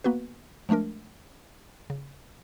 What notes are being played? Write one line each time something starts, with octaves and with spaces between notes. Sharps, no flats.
A#3 B3 F#4 B4
F3 G#3 A3 D4 A#4
C#3